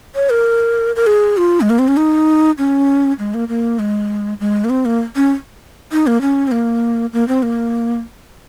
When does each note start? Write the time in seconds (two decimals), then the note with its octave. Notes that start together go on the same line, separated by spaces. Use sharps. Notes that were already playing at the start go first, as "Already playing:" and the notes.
0.15 C#5
0.31 A#4
0.96 A#4
1.07 G#4
1.37 F4
1.61 G#3
1.70 A#3
1.79 C4
1.88 C#4
1.97 D#4
2.58 C#4
3.19 G#3
3.34 A#3
3.48 A#3
3.79 G#3
4.40 G#3
4.64 A#3
4.70 C4
4.85 A#3
5.16 C#4
5.92 D#4
6.07 A#3
6.21 C#4
6.48 C4
6.52 A#3
7.13 A#3
7.28 C4
7.43 A#3